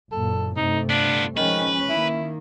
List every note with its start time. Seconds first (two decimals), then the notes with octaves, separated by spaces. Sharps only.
0.12 F#1 A#2 A4
0.56 G2 C3 A3 D#4
0.90 B3 D4 F4
1.37 D#3 F3 G#3 C#4 B4
1.89 D#3 A#3 E4